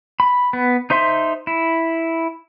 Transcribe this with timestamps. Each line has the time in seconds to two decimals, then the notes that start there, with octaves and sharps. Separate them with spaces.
0.20 B5
0.53 B3
0.90 D#4 C5 E5 C6
1.47 E4